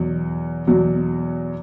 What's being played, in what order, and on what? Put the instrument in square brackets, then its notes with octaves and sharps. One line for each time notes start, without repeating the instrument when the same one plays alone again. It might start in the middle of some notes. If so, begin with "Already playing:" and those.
Already playing: [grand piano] E2 B2 F#3
E2 B2 F#3